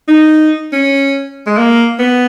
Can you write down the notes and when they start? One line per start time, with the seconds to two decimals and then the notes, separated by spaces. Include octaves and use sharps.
0.08 D#4
0.72 C#4
1.47 G#3
1.57 A#3
1.99 B3